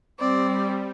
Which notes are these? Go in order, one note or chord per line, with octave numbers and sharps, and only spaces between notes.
G3 C4 D5